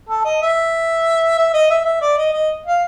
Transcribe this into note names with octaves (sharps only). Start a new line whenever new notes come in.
A4
D#5
E5
E5
D#5
E5
E5
D5
D#5
D#5
F5